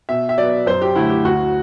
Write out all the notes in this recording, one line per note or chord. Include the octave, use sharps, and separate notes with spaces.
B2 E5
E5
F#3 B3 D5
F#2 C5
G4
D3 A3 E4
G4
D2 F#4